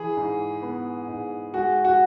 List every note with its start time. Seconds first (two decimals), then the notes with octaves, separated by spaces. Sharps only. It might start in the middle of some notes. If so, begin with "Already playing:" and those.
Already playing: E3 G#4
0.17 G#2
0.63 B3
1.08 G#2
1.54 G#3 F#4
1.85 F#4